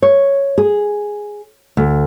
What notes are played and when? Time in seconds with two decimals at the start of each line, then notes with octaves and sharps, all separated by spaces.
0.02 C#5
0.58 G#4
1.77 D2